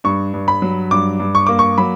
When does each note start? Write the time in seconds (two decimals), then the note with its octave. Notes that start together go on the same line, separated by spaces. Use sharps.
0.04 G2 C#6
0.34 G2
0.48 B5
0.62 F#3
0.91 G2 D6
1.20 G2
1.35 C#6
1.47 A#3 D6
1.59 C#6
1.78 F#3 B5